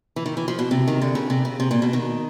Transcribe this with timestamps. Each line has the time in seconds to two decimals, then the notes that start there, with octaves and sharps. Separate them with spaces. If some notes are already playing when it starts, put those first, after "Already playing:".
0.16 E3
0.26 D#3
0.37 E3
0.48 F3
0.59 B2
0.71 C3
0.88 D#3
1.02 D3
1.15 C#3
1.30 C3
1.45 C#3
1.60 C3
1.71 A#2
1.82 B2
1.93 D#3